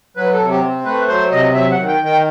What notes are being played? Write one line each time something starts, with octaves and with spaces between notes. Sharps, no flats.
F#3 B4
A4
C3
G4
C4
A3 B4
F#3 C5
C3 D#5
F#3 E5
F#5
D#3
G5
D#3
G5